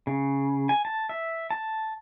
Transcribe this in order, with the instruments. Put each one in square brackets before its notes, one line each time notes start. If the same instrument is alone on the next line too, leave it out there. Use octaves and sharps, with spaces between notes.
[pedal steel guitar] C#3
G#5
A5
E5
A5